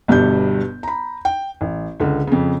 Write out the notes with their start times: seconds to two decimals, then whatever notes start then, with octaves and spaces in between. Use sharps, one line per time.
0.08 G1 G2 B2 G3 G6
0.83 A#5 B5
1.25 G5
1.61 A1
2.00 C#2 D3
2.27 F2 C#3